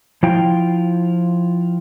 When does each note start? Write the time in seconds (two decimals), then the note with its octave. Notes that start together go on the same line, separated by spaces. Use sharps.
0.23 F3 E4 F4 G5